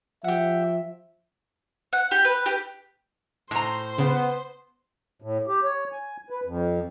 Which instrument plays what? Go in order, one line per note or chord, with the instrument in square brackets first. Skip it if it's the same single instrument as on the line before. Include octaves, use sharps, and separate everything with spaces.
[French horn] F3 [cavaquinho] G4 F#5 [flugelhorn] E5
[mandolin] F#5
G4
B4
G4
[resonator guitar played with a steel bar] A2 A#5 [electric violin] C5 C6
[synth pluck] C#3 [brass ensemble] B3
[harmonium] A2
G4
C#5
G#5
B4
F2